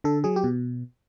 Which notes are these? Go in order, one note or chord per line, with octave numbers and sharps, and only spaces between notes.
D3 A4
F#3 G#4
G4
B2